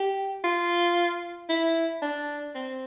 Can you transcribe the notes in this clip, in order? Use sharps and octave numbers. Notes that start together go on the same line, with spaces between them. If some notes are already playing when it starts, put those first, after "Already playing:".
Already playing: G4
F4
E4
D4
C4